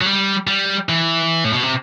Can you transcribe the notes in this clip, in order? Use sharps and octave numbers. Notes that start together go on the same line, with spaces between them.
F#3
G3
G3
E3
A2
B2
C3